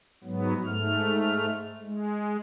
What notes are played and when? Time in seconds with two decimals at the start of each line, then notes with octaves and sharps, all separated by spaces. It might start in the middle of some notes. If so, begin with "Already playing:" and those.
0.24 G#2 F#3 B3
0.66 G#2 A3 F6
1.83 G#3